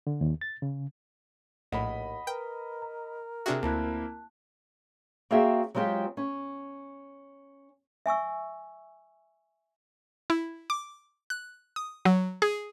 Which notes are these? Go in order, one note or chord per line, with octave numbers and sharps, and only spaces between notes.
D3
D#2
A6
C#3
A#1 D#2 A2 D#5 F#5 B5
A#4 B4 G5
A#5
C3 D4 F#4 G#4 E5 G5 F6
D2 A#3 C4 E4 A5 F#6
A#3 C4 F#4 G#4 C#5 E5
F#3 G#3 C4 F4 G4
C#4
E5 G#5 C#6 E6
E4
D6
F#6
D#6
F#3
G#4